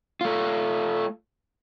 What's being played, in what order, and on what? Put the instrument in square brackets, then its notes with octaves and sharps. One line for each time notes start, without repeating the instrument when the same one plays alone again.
[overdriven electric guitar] A3 F4